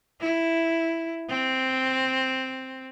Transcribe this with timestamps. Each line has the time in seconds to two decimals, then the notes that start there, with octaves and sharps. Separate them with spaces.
0.21 E4
1.29 C4